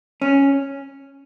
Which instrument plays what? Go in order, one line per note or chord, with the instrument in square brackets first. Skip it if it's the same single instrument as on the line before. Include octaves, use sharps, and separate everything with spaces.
[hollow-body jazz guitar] C#4